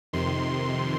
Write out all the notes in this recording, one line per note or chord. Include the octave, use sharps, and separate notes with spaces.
F2 C3 D#3 C6